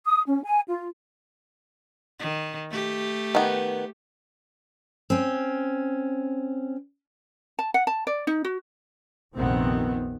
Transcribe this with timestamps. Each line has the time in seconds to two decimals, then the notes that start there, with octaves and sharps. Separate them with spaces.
0.05 D#6
0.26 C#4
0.43 G#5
0.68 F4
2.20 D#3
2.70 A3 G4
3.35 D#3 B3
5.10 C4 C#4
7.59 A5
7.74 F#5
7.87 A5
8.07 D5
8.27 D#4
8.45 F#4
9.36 F1 A#1 C3 D#3 B3 C4